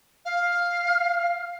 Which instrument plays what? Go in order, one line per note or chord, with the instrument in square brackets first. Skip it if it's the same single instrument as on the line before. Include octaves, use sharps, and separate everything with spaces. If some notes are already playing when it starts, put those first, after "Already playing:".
[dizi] F5